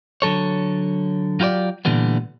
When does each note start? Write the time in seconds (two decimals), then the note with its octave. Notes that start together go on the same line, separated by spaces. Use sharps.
0.22 D3 F#3 A4 C#5
1.40 F#3 F4 G4 B4 D5
1.85 A#2 D3 E3 G3 B3